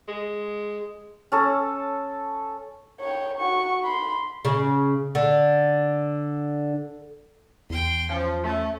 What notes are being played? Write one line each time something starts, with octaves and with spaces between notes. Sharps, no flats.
G#3
C#4 A4
C#5 G5
F#4 C#6
B5 C6
C#3
D3
E2 G5 C6
F3 C#4
A3 C#4